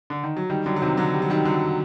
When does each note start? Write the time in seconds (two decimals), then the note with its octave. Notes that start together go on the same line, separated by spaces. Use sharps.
0.10 D3
0.24 D#3
0.37 F#3
0.50 D#3 G3
0.66 D3 F#3
0.76 F#3
0.82 C3 D#3
0.97 D3 F#3
1.14 G3
1.22 F#3
1.30 D#3 G3
1.45 D3 F#3